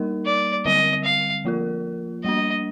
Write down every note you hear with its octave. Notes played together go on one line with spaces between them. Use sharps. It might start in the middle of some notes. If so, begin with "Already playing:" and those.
Already playing: G3 A#3 D#4 A#4
D5
D3 G3 C4 D#5
F5
F3 A#3 F4 A#4
G3 A#3 D4 D#5